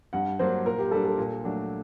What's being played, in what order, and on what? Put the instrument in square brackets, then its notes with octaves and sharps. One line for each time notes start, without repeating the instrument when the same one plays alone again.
[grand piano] G2 [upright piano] F#5
[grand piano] F#3 A#3 D4 [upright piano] C5
[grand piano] A#2 [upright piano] A#4
[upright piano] G4
[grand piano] G3 D4 [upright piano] A4
[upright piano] A4
[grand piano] A#2
F#3 A3 D4 F#4